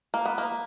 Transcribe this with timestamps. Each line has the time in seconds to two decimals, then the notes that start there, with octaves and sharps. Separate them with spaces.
0.14 A#3
0.25 B3
0.38 A#3